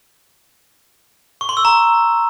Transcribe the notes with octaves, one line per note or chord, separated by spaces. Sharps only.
C#6
C6
E6
A#5